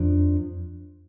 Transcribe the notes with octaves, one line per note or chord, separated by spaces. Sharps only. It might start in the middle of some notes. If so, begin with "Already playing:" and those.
Already playing: F2 F3 D4